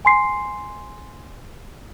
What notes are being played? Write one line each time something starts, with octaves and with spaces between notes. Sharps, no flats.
G#5 C6 C7